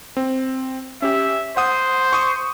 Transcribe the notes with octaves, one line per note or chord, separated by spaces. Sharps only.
C4
C#4 G4 E5
C5 F#5 D#6
C#6 D#6